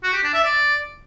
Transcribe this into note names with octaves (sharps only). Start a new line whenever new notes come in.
F#4
G4
D4
E5
D5